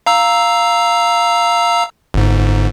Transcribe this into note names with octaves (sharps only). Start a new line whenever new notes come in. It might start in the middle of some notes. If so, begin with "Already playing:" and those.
F5 A#5 E6
G1 G#2